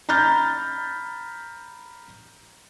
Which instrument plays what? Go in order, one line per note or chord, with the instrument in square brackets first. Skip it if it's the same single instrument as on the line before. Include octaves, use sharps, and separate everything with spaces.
[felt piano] A#5 B5 F6 G6 A6